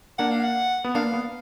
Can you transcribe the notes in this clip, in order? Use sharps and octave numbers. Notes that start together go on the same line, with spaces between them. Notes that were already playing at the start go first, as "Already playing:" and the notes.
A#3 D4 F#5
F5
F#5
B3
A#3 D4 F5
B3